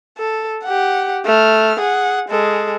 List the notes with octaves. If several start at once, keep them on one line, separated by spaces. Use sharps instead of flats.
A4
G4 F#5
A3 F6
G#4 F#5
G#3 A4